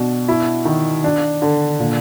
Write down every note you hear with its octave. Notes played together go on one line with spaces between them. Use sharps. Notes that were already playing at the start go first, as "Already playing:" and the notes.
Already playing: B2 D4
E4
D#3
D4
D3
A#2